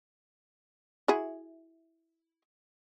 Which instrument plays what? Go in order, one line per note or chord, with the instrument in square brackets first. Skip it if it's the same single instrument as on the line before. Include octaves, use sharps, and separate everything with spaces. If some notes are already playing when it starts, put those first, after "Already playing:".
[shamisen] E4 F#4 G#4